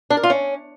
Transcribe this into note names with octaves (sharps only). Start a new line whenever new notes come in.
D4
A#4
F4
C#4